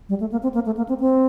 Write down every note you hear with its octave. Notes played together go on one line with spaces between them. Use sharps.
G3
A3
A#3
C4
A#3
A3
A#3
C4
C4